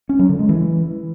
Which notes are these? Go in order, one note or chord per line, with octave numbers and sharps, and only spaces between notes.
C#4
F#3
D3
G#3
E3